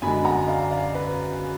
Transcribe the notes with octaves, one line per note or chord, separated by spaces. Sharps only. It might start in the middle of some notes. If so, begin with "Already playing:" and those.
F#2 D3 G#3 G#5 B5
F#5 A#5
D5 F5
D5 F5
B4